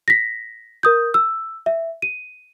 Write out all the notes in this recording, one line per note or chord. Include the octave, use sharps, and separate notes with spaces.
A#6 B6
A#4 D#6 G6
E6
E5
D#7